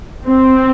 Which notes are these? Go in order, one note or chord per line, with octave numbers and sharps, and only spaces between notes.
C4